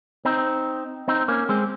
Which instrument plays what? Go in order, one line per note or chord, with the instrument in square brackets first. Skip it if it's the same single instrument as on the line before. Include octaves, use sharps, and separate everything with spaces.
[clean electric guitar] C4 D#4
C4 D#4
A#3 C#4
G#3 C4